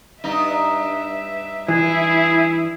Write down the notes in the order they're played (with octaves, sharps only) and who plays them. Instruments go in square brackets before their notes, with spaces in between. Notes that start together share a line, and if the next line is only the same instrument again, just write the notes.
[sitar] G2 D#4 [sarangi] E5
[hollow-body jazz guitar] E3 [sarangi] E4 [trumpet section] G#4